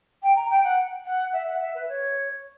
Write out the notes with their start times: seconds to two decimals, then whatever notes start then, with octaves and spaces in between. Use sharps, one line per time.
0.22 G5
0.35 A#5
0.50 G5
0.64 F#5
1.05 F#5
1.33 E5
1.47 F#5
1.60 E5
1.74 B4
1.88 C#5